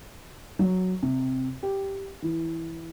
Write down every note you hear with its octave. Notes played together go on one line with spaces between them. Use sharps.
F#3
C3
G4
E3